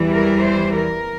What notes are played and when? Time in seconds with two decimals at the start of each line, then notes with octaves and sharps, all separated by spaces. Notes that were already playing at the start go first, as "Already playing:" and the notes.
Already playing: E2 E3 G3
0.14 A#4
0.43 C5
0.74 A#4